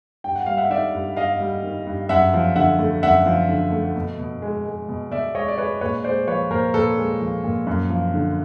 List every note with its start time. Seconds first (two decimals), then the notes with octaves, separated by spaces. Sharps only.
0.24 G2 G5
0.35 F#5
0.46 G3 F5
0.57 E5 F#5
0.70 D#3 D5 E5
0.94 G2
1.16 G2 D#5 F5
1.40 G3
1.63 D#3
1.87 G2
2.09 F#2 E5 F#5
2.34 F3
2.56 D3 E5 F#5
2.79 A3
3.03 F#2 E5 F#5
3.26 F3
3.49 D3
3.72 A3
3.96 B2
4.19 B2
4.42 G#3
4.66 G#3
4.89 B2
5.12 B2 D5 E5
5.35 G#3 C#5 D#5
5.48 D5
5.58 G#3 B4 C#5
5.81 A#2 B4 C#5
6.04 G#3 C5 D5
6.27 F3 B4 C#5
6.50 A#2 A#4 C5
6.74 A#2 A4 B4
6.97 G#3
7.21 F3
7.44 A#2
7.67 F#2
7.90 F3
8.14 D3